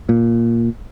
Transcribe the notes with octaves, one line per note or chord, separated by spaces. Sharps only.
A#2